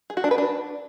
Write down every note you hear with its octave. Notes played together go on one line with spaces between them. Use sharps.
G#4
F#4
D4
B4
D4